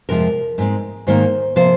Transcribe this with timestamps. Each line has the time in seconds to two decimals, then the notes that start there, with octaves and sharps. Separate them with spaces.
0.09 F2 C3 F3 G#3 A#4
0.58 G#2 G#3 C4
1.07 G#2 D#3 A#3 C5
1.56 C3 F3 A#3 C5